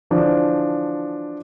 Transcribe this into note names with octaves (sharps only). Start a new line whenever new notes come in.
D3 E3 F3 D4